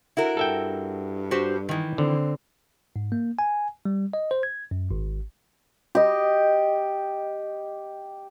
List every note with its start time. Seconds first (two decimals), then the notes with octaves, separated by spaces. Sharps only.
0.17 E4 F#4 A#4
0.37 G2 A4 E5 G5
1.31 F#4 G4 C5
1.69 D#3 E3
1.98 D3 C4
2.96 G#2
3.12 A#3
3.39 G#5
3.85 G3
4.13 D#5
4.31 C5
4.43 G#6
4.71 F#2
4.91 G#1
5.95 G4 D#5